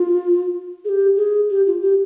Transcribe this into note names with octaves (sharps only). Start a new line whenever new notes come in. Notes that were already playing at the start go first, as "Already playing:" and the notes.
Already playing: F4
G#4
G4
G#4
G4
F4
G4